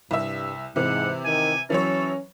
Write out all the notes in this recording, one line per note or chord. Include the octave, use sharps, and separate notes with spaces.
C2 G2 E5
G#2 C3 E3 F#5
D#3 G#5
E3 F#3 C#4 A4 C#5